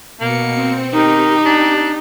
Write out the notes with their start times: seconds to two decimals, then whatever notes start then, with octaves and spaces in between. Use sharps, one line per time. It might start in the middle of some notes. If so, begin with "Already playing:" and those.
0.20 B2 A#3 C#7
0.54 C4
0.94 D#3 D#4 G4
1.45 D4